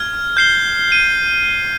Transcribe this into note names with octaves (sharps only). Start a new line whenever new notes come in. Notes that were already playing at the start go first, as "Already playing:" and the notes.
Already playing: F6 G#6
G6 C7 G7
D#7 G7